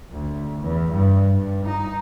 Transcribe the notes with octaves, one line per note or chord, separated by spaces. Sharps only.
D2
E2
G2
G2
D#4